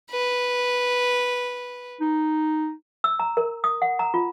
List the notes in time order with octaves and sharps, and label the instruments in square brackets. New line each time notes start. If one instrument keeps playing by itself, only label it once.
[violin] B4
[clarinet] D#4
[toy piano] E6
A#5
A#4
D#6
F#5
A#5
F4